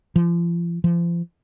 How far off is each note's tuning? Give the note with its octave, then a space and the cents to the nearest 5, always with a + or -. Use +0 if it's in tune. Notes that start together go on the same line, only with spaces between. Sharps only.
F3 -35
F3 -35